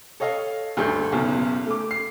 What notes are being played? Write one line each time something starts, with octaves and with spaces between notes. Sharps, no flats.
A4 C#5 D#5 F5
D2 G2 G#4 A4 G6
F#1 B1 E2 C#3
A3 D6
C7